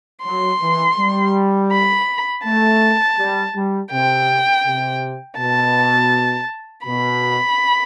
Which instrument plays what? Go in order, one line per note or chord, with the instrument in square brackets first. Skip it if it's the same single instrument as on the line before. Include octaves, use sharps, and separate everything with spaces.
[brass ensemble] F#3 [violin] C6
[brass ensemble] E3
G3
[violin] B5
[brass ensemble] A3 [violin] A5
[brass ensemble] G3
G3
[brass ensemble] C3 [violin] G5
[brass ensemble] C3
[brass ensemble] B2 [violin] A5
[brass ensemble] B2 [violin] B5